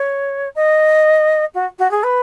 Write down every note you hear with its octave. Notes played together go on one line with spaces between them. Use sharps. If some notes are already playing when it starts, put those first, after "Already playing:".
Already playing: C#5
D#5
F#4
F#4
G#4
B4